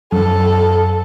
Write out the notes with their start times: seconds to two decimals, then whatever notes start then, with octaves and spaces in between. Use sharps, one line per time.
0.12 F#2 A4